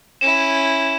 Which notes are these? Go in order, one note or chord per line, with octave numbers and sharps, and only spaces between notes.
C#4 E4 E7